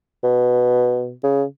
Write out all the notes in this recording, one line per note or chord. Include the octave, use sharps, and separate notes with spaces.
B2
C#3